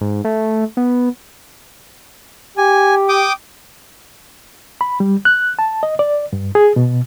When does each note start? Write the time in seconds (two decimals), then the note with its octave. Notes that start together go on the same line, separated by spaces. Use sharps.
0.01 G#2
0.25 A3
0.77 B3
2.57 G4 G#5
3.09 G5 D6 D#6
4.81 B5
5.00 G3
5.25 F#6
5.59 A5
5.83 D#5
5.99 D5
6.33 G2
6.55 G#4
6.76 B2